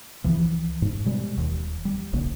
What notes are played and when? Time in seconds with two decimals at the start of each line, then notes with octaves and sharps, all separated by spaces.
0.24 C#2 E3 F3
0.82 G#2
1.05 B2 G3 G#3
1.38 D#1 D#2
1.85 G3
2.13 D#1 A#1 C#3 A#3